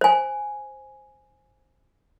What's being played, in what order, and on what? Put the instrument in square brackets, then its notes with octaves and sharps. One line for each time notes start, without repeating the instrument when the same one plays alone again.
[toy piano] C5 G#5